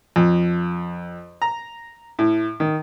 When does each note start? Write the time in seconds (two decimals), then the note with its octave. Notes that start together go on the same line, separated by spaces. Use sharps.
0.16 F2
1.42 A#5
2.19 A2
2.60 D#3